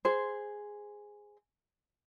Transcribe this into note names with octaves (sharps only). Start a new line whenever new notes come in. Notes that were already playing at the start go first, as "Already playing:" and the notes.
G#4 C5